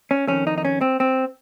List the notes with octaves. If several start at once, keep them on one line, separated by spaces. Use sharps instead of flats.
C#4
F2 D#3 C#4
D#4
D#4
C#4
C4
C4